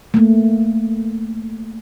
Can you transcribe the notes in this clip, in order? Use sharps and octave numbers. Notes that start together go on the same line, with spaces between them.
A3 A#3